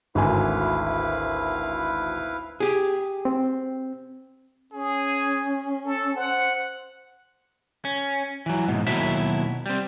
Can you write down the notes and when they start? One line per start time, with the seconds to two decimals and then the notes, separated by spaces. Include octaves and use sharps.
0.15 G#1 D2 E4 B4 F5 G#5
2.60 G4 G#4
3.25 C4
4.73 C#4 G#4
5.85 A4
6.16 C5 F#5
7.85 C#4
8.46 E3 F#3
8.68 G#2 B2
8.87 D#2 B2 F#3 E4 E5
9.66 G3 C4